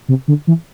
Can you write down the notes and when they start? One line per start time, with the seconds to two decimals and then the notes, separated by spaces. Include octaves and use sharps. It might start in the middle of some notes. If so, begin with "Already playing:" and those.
0.09 C3
0.28 D3
0.47 E3